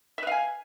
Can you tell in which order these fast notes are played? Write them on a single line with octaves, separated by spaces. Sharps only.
E5 B4 F5 G#5